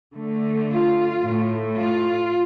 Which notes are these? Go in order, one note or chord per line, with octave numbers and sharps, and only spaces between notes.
D3 A3
F4
A2 A3
F4